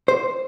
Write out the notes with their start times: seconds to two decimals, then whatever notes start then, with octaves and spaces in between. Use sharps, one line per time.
0.08 C5